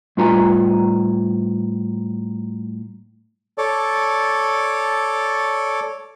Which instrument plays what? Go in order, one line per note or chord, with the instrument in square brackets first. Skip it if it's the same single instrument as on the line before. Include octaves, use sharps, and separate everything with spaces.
[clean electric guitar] A2 G3 F4 B4 G#5 A#5
[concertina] A4 C#5 D5